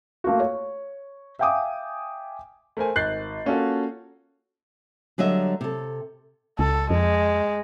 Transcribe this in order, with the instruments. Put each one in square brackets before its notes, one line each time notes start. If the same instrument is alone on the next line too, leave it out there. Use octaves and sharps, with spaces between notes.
[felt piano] A3 A#3 F4 F#4
C#5
E5 F5 G5 G#5 D6 D#6
[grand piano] A3 A#4 C5 G#5
G#1 F#6 G6 A6 C7
A#3 C#4 F4 F#4 A4
[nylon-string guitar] D3 F#3 G3 D#5 E5
C3 A4
[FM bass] C#2 [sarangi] A4
[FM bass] F2 [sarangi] G#3